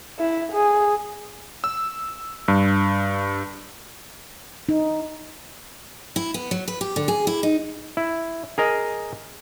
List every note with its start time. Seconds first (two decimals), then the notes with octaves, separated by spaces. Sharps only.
0.19 E4
0.52 G#4
1.64 E6
2.48 G2
4.69 D#4
6.16 E4
6.34 B3
6.51 F#3
6.68 B4
6.81 G4
6.96 D3
7.08 G#4
7.27 E4
7.43 D#4
7.97 E4
8.58 G#4 A#4 D#5